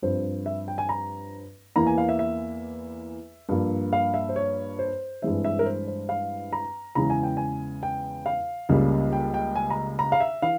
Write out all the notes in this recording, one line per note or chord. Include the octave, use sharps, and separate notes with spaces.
G2 F3 C4 C5
E5
G5
G#5
A#5
E2 E3 A#3 A#5
G#5
F5
E5
E5
G2 F3 A#3
F5
E5
C5
C#5
C5
G2 E3 G#3 C4 E5
E5
A#4
C5
C5
F5
A#5
E2 C#3 E3 G#3 A#5
G#5
G5
G#5
G5
F5
C#2 C#3 G3 A#3
G5
G5
G#5
A#5
A#5
F5
E5
E3 F5